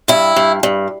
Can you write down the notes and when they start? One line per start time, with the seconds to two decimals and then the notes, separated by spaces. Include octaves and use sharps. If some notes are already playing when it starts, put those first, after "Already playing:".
0.08 G2 E4
0.36 G2
0.63 G2